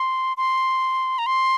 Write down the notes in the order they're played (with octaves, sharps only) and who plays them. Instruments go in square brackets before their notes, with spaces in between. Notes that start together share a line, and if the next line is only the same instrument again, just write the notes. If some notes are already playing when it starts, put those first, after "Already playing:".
Already playing: [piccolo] C6
C6
A#5
C6